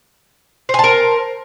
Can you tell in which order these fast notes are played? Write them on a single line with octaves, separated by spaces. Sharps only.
C5 G#5 A5 A#4